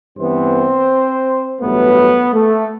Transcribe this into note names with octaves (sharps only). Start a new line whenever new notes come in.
G2 E3 B3 C4 C5
A1 G2 F#3 A3 B3 B4
A3 A4